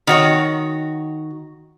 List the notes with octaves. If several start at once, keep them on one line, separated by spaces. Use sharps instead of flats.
D#3 F#4 C#5